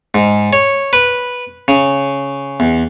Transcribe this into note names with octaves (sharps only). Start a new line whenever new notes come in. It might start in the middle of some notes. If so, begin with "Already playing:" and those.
G#2
C#5
B4
C#3
E2